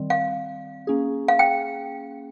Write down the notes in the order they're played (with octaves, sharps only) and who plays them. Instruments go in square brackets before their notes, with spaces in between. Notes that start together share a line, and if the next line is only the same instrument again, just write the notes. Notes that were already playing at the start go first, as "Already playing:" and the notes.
Already playing: [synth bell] D#3 G3 C4
[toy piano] F5
[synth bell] A#3 C#4 G#4
[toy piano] F5
G5